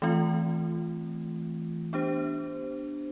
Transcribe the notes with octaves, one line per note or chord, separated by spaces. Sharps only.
E3 A3 C4 F4
B3 D4 G4 C5